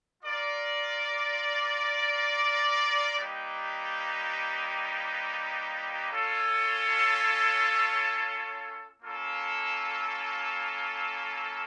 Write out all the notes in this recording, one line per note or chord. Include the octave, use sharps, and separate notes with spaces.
F4 A#4 D5
G3 A#3 D#4 G4 B4
C#4 F4 A4 C#5
A#3 C#4 F4 A4